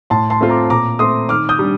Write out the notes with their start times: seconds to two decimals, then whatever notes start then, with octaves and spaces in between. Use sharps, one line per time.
0.10 A2 A5 C6
0.30 A5 C6
0.41 A3 C4 F4
0.49 A#5 D6
0.69 A#2 A#5 D6
0.99 A3 C4 C6 D#6
1.29 D#3 D6 F6
1.49 D#6 G6
1.59 G3 D4